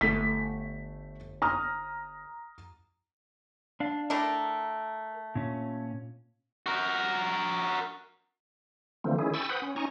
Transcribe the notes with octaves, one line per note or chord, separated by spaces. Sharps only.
G1 A3 B6
A#5 D#6 F6
D4 F5
A3 D4 E4 A#4 G5 A#5
A#2 C#4
F#4 A#4
D3 E3 F3 A3 A#3 C4
D#3 C#4 E4 G#4
G5 G#5 B5 C#6 E6 A6
B4 C5 F#5 G5 B5 D#6
C#4
C#4 D#4 G#5 A#5 C#6